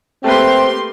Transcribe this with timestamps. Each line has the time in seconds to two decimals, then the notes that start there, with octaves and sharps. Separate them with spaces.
0.24 A3 A#3 C4 G4 B4 E5 G5 C6